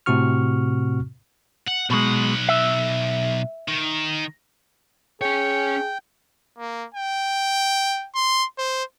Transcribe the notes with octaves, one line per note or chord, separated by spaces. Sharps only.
A2 C3 C4 F#4 C#6 F6
F#5
B1 B2 G#3 F#5
E5
D#3
C#4 G#4 C#5 G5
A#3
G5
C6
C5